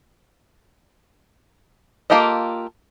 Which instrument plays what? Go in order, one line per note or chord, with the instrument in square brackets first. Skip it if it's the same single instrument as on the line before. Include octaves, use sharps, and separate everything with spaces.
[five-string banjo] A#3 F4 G4 A4 D#5